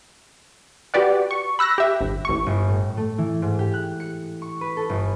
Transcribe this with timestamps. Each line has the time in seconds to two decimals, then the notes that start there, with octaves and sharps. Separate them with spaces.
0.94 F#4 G4 B4 D5 F#5
1.31 C#6
1.59 B5 E6 F#6 A#6
1.78 G4 E5
2.01 G1
2.25 A1 C#6
2.46 G1
2.69 A2
2.97 A3
3.18 E3
3.42 G#2
3.59 G4
3.74 F#6
4.00 C#7
4.42 C#6
4.61 B4
4.77 A4
4.89 G1